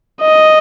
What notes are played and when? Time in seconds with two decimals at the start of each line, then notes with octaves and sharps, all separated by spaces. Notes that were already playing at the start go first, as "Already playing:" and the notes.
0.21 D#5